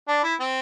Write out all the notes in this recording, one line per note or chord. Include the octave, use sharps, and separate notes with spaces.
D4
E4
C4